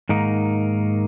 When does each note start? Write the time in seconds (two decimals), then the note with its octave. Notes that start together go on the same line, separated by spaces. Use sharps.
0.09 G#2 D#3 A#3 D#4